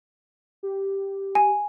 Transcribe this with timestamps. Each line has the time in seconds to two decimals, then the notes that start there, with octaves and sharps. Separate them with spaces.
0.63 G4
1.35 G#5